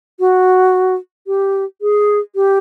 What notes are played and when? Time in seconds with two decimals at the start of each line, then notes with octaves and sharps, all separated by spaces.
0.20 F#4
1.27 G4
1.82 G#4
2.35 G4